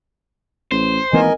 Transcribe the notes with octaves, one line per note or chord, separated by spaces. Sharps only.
A1 C5
G#1 E3 A#3 B3 A#4 D#5 G#5